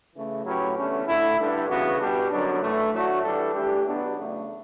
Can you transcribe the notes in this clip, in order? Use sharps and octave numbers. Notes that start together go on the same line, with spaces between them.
C#3 E3 A3
A2 F#3 C#4 G4 B4
E2 D3 A3 C#4
D3 A3 E4
G2 D3 G3 D4 A4
C#3 E3 B3 F#4
B2 G3 D4 G4
F#2 D3 F#3 B3 D4
A2 E3 A3
A2 F#3 A3 D4 F#4
E3 G3 D4 A4
E3 A3 D4 G4
E2 B2 F#3 B3 D4
C#3 F#3 A3